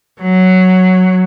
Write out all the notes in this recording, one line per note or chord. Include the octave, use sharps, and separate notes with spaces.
F#3